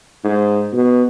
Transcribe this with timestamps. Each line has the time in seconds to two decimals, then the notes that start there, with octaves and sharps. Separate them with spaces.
0.24 G#2
0.73 B2